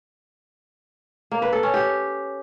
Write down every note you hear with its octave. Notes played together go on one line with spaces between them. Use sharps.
A#3
B4
A4
C#4
G4